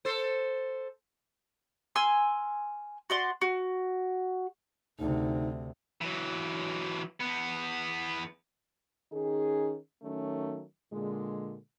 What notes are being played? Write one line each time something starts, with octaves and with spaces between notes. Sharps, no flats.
A4 C5
G#5 C6 E6 F6
F#4 D5 C6
F#4
D2 C3 D#4
E3 F#3
E2 B3
D#3 C#4 D#4 G#4
D#3 F#3 A3 C#4
A#2 D3 G#3